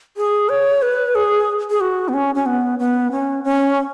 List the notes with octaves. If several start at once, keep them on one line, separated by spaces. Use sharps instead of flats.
G#4
C#5
B4
G#4
G#4
F#4
B3
C#4
C#4
B3
B3
C#4
C#4